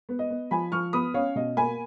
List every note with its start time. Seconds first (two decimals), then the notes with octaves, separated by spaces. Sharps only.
0.09 B3
0.19 D#5
0.30 B3
0.51 F3 G#5 B5
0.72 F3 C#6 F6
0.93 B3 B5 D#6
1.14 C#4 C#5 F5
1.36 B2 D#5
1.57 A#3 G#5 B5